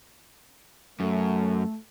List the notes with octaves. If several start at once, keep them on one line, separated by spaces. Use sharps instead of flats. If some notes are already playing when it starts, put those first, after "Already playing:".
F#2 A3